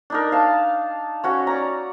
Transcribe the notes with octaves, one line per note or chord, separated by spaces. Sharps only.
D4 D#4 A#4
F5 A5
C#4 F#4 C#5
D5 A#5